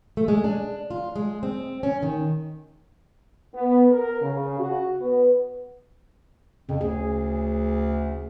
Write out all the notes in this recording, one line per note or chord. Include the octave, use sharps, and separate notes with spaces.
A3
G#3
D4
F4
G#3
C4
C#4
D#3
B3
A#4
C#3
F#4
B3
F2 C#3
D2 G#4